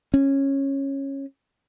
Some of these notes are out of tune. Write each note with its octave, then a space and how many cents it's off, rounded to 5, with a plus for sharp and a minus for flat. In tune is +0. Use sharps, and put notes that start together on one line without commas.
C#4 -15